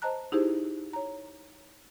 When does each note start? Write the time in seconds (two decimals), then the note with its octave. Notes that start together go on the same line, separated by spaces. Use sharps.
0.02 C5 D#5 A5 A#5 F#6
0.32 D#4 E4 G4 G#4 C5
0.93 C#5 A#5